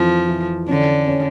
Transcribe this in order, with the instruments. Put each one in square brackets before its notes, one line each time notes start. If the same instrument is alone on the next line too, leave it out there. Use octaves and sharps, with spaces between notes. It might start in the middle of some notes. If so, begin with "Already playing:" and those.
Already playing: [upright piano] F2 E3 [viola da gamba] F3
[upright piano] E3
[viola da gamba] D3 [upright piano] C#4
[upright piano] C#4